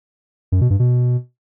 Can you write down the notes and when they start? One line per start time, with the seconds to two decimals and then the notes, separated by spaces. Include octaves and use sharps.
0.52 F#2
0.61 B2
0.70 G2
0.80 B2